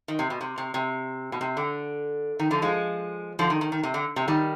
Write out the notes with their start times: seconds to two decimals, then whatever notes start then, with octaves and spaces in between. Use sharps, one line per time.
0.08 D#3
0.19 C3
0.30 B2
0.41 C3
0.58 C3
0.74 C3
1.32 B2
1.41 C3
1.57 D3
2.39 D#3
2.51 D3 F3
2.62 F3 G#3
3.39 D3 F3
3.50 D#3
3.61 D#3
3.72 D#3
3.83 C3
3.94 D3
4.16 C3
4.28 D#3 G3